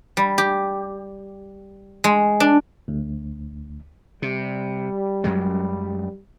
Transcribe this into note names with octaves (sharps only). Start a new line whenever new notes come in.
G3
G4
G#3
D4
D2
C3 G3
F#2 F#3 G#3